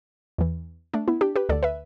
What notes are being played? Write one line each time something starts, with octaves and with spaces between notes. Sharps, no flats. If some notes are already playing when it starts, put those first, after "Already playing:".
E2 E3
A3 D4
B3 E4
D4 G4
G4 B4
D2 D3 A4 D5
B4 E5